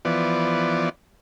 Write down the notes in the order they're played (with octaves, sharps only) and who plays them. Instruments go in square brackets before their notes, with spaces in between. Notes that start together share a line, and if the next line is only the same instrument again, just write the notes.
[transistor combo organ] E3 F3 B3 D5